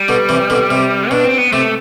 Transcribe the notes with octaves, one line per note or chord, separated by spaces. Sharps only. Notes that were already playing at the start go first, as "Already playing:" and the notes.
Already playing: G3
B2 D3
C3 E3
B2 D3
C3
B2 D4
C4
B3
C3 A3